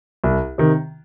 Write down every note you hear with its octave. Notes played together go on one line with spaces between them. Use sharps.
C2
C3 D#3